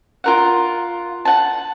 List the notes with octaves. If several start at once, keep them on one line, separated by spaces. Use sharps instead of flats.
F4 A#4 F#5
F#5 A5